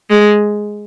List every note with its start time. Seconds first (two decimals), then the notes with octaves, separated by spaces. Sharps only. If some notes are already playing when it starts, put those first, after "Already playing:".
0.10 G#3